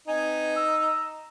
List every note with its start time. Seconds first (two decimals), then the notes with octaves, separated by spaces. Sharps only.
0.08 C4 D#4 B4 G#5
0.56 D#5 A#5 E6